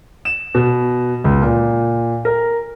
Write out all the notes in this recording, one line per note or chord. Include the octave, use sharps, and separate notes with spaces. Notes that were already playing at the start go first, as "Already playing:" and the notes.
E7
B2
C#2
A#2
A#4